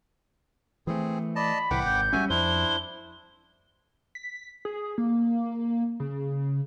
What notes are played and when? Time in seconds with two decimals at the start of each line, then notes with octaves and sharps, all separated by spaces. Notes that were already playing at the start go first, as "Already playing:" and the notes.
0.87 E3 A3 C4 G#4
1.36 D5 D#5 A5 B5
1.71 C2 A2 E3 F#5 G5 D6
1.85 G#1 G6
2.13 G3 A3 C#4 F#4 E5 G#5
2.30 F2 D4 E4 C5 G7
4.15 B6
4.65 G#4
4.98 A#3
6.00 C#3